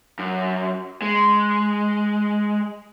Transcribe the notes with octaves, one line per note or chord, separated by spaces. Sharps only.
F#2
G#3